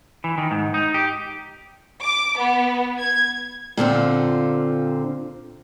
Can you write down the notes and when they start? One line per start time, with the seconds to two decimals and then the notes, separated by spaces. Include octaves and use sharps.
0.24 E3
0.38 D#3
0.51 G#2
0.74 D#4
0.94 G4
2.03 D6
2.38 B3
2.99 G#6
3.77 A#2 D3 C4 F4